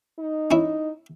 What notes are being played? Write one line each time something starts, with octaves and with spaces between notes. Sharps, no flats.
D#4
C#4 E4